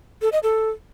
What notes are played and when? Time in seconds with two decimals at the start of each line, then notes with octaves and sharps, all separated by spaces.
0.22 A4
0.32 D#5
0.43 A4